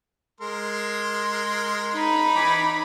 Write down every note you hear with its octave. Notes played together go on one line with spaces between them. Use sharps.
G#3 A#4 C6
D#4 B5
E3 G#5 D6